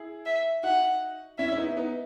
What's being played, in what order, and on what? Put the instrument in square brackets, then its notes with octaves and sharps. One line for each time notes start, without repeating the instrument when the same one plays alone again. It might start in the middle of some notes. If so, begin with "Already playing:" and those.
Already playing: [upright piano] E4 G#4
[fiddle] E5
[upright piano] D#4 F#4 [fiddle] F#5
[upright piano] C#4 E4 [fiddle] E5
[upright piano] E4
B3 D#4
B3 D#4